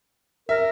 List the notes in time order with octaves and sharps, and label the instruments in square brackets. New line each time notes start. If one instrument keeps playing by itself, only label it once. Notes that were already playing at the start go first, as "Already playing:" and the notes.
[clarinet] A#4 [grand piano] E5